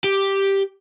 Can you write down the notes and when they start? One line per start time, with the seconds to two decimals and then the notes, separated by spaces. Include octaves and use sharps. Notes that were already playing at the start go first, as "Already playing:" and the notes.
0.04 G4